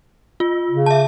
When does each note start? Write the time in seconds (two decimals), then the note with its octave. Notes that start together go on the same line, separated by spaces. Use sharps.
0.40 F4
0.71 C#3
0.86 E5 A5